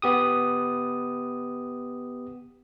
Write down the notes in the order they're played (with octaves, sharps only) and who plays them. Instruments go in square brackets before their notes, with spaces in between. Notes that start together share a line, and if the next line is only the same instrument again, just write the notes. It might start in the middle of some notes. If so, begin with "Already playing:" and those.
[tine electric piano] B3 G4 D#6